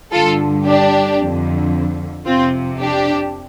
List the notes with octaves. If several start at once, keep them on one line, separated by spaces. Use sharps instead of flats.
G2 D3 F4 A4
D4 G4
F2 D3
F2 C3 C4 F4
D4 G4